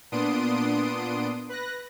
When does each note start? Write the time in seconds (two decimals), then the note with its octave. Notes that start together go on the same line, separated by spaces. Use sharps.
0.12 A#2 B3 D4 C6 D#6 D7
1.49 B4 F#6 A#6